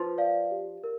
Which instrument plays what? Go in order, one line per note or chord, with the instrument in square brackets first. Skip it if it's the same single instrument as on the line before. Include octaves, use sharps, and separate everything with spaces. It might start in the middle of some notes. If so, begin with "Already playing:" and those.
Already playing: [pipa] F3 [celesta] B4
[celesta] D5 F5
G4
A#4